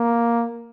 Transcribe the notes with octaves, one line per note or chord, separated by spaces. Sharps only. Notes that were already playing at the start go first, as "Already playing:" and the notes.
Already playing: A#3